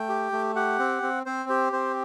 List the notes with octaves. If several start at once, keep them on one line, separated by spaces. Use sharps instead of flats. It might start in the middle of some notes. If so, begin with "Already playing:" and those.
Already playing: A3 G5
G4
A3
G4 F#5
C4
C4
C4 C5
G4 C5
C4 C5